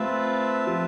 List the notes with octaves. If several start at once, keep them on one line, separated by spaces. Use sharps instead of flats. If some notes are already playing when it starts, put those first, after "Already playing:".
Already playing: A3 C4 F4 B4 E5 A5
F3